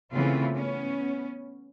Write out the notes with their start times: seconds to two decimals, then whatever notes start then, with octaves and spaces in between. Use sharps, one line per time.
0.11 C#3 E3 A3 B3 C4 F4
0.54 B3 C#4